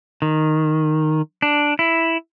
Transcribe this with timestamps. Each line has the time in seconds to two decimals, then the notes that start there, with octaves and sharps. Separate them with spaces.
0.22 D#3
1.42 D4
1.79 E4